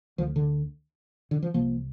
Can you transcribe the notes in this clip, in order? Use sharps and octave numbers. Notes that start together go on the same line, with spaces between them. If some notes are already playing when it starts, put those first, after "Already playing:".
D2 D3 F3
D3
D3
F3
C2 C3 F3 A#3